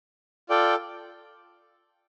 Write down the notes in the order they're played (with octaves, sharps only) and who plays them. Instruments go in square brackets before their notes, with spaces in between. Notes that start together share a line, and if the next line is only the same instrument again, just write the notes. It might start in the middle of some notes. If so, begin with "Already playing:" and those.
[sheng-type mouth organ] F4 A4 D5 G5